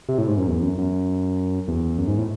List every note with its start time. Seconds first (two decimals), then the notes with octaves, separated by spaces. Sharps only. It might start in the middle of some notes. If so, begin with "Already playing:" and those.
0.09 C3
0.18 A2
0.28 G#2
0.38 F#2
0.48 E2
0.62 F#2
0.78 F#2
1.68 E2
1.98 F#2
2.08 G#2
2.18 A2